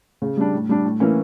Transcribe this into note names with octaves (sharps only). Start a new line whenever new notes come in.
C#3
G3 D4
A2
G3 D4
A2
E3 A#3 C#4